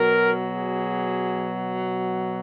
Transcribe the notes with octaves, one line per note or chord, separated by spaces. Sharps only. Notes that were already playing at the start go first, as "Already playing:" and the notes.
Already playing: B2 F#3 A#4
G#4